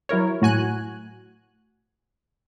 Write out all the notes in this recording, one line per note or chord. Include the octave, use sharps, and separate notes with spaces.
F#3 E4 A#4 C#5
A2 F#4 G#5 F#6